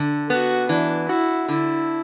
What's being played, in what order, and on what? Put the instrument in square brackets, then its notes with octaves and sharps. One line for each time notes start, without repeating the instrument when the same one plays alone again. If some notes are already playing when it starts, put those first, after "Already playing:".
Already playing: [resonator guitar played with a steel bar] D3 [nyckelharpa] A4
[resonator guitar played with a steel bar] B3 [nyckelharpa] F#4
[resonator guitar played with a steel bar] E3 [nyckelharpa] D4
[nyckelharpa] E4 [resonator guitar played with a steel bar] F#4
[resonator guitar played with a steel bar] D3 [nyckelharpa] E4